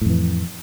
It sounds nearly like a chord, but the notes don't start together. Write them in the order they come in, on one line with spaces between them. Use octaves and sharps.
A2 F2 E3